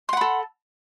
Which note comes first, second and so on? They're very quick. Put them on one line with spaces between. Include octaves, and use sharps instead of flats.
C6 F#5 B5 A4